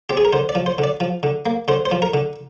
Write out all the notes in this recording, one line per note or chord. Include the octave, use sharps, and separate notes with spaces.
C4 G4
G#4
A#4
D3 C5
D5
F3
C5
D3
D5
F3
D3
A#3
D3 C5
C5
F3
A#4
D3